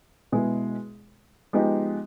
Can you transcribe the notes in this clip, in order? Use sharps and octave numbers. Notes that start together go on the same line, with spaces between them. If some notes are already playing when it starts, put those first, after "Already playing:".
B2 G#3 B3 E4 G#4
F3 G#3 B3 D#4 G4